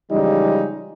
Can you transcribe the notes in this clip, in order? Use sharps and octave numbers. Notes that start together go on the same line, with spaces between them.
C#3 E3 F3 G3 G#3 D#4